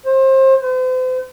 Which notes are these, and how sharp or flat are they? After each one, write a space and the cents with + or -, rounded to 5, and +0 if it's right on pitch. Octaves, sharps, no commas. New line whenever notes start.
C5 +30
C5 -40